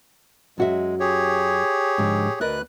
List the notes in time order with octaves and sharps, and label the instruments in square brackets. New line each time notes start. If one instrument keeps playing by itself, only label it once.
[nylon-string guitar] F#2 F#4 E5 [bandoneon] G#3
[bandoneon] G4 G#4 C#5
[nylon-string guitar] G#2 D3 F3
[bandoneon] D2 B4 F#6 [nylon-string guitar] A#4 D5 D#5